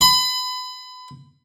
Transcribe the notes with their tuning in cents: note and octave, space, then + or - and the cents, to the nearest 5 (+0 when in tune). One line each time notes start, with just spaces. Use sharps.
B5 +30